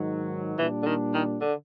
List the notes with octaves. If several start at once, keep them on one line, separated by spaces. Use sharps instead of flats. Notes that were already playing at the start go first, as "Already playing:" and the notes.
Already playing: G#2 D#3 F#3
A#2 E3 G3 A#3 D4
D3
D#3
D#3
D3